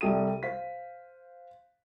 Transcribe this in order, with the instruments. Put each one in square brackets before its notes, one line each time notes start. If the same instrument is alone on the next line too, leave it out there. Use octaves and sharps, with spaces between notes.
[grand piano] C2 G3 A4 D#6 D#7
C5 F5 B6